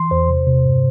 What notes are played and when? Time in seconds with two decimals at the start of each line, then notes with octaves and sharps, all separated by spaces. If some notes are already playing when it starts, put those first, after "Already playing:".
Already playing: E3 C6
0.11 E2 C5
0.29 C3
0.47 C3
0.65 G2